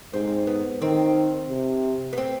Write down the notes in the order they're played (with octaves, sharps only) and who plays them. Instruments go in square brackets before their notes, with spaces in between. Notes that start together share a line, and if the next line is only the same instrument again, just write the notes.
[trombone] G#2 [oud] C4
[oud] B3
[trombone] D#3 [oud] C4
[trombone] C3
[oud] B3
C4